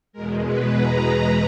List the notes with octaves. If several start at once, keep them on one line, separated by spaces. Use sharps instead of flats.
E2 B2 G#3 A#4
B4
A#5